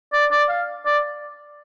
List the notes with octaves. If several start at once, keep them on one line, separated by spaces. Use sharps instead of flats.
D5
D5
F5
D5